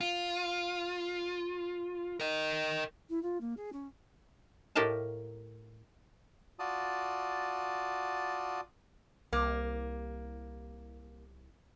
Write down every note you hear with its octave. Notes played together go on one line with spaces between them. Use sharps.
F4
A#4 D#5
E4
F4
A#3
G#4
C#4
A2 G4 A#4 D#5 F5 A5
F4 F#4 D5 A5 D#6
C2 A#3